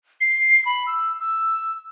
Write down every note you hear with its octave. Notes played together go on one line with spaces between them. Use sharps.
C7
B5
E6
E6